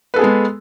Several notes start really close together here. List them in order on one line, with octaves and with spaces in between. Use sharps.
B4 A4 G#4 B3 G#3